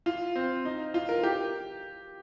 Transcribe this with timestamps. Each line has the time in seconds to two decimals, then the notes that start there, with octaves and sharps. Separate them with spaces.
0.06 F4
0.36 C4
0.65 D#4
0.94 F4
1.09 A#4
1.23 G4